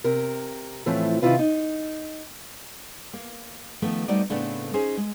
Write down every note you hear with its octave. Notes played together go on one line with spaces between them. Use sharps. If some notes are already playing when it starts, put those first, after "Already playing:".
C3 A#4
A2 E3 F3 A3 C4
C3 D#3 E4 F4 B4
D#4
A#3
D#3 F3 A3 B3
G3 A3 D#4 F#4 C5 D5
A2 C#3 A3 B3 C4 D4
C#4 D#4 G#4 C5
G#3